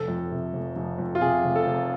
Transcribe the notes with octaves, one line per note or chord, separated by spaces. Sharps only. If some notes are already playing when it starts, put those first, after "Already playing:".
Already playing: F1 A4
F2
C3
F1
F1
F2
F4
C3 G#4
F1
A4
F1